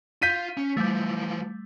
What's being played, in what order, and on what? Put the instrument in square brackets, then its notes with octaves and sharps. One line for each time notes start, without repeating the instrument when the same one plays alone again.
[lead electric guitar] F4 F5 [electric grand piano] G6 B6 D#7
[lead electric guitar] C#4
[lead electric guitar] E3 F3 [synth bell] G3 A3